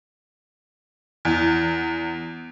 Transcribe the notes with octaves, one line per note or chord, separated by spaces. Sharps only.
E2